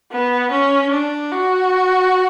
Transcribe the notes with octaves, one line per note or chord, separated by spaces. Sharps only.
B3
C#4
D4
F#4